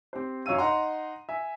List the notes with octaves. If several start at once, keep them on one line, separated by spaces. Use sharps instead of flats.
C4 G4 C5
F#2 C#5 F5 E6 D#7
D#4 F#5 A#5 C6
E5 G#5